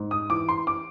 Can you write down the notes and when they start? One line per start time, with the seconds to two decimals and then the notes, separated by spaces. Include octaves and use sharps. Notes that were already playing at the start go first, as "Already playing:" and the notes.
Already playing: G#2
0.11 D#6
0.30 E3 D6
0.49 C6
0.67 D6